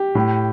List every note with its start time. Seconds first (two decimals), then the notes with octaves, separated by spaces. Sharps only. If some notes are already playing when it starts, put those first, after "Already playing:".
Already playing: G4
0.15 A2